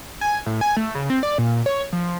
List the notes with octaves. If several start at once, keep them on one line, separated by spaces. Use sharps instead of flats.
G#5
A2
G#5
A3
C#3
C4
D5
A#2
C#5
F3